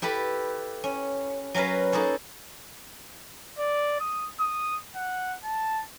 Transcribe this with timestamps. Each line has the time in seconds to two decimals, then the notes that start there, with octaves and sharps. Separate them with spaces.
0.02 E4 G4 A4 B4
0.84 C#4
1.54 F#3 C#4 A#4 B4 F5
1.92 A#3 D#4 G#4 A4 C#5
3.58 D5
4.00 D#6
4.39 D#6
4.96 F#5
5.44 A5